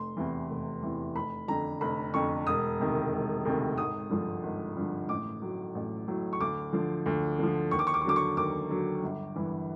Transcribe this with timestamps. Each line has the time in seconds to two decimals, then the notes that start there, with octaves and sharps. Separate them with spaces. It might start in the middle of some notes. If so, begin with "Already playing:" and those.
Already playing: F1 C6
0.17 E2 C3 E3
0.50 F1
0.83 E2 C3 E3
1.15 F1 B5
1.48 F2 D3 A#5
1.81 F1 B5
2.14 F2 D3 C#6
2.47 E1 D#6
2.79 D2 C3 D#3
3.12 E1
3.45 D2 C3 D#3
3.78 G#1 D#6
4.10 G2 D3 F3
4.43 G#1
4.76 G2 D3 F3
5.08 A1 D6
5.42 A2 F#3
5.75 A1
6.08 A2 F#3
6.33 C#6
6.40 D2 D6
6.73 D3 F3
7.06 D2
7.39 D3 F3
7.71 D#2 C#6
7.79 D6
7.87 C#6
7.94 D6
8.02 C#6
8.04 D3 F#3 D6
8.16 C#6
8.37 D#2 D6
8.70 D3 F#3
9.03 G1
9.35 G2 E3